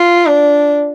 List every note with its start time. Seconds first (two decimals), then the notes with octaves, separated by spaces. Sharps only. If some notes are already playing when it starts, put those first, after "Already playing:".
Already playing: F4
0.27 D4